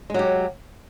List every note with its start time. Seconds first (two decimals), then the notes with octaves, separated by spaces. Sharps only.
0.10 G#3
0.14 F#3
0.19 G4